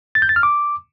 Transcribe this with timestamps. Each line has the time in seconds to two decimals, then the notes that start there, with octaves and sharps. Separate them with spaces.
0.15 A6
0.22 G6
0.29 A6
0.36 F6
0.43 D6